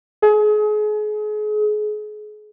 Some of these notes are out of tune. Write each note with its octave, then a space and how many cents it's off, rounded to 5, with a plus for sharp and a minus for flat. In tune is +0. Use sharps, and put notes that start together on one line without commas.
G#4 +35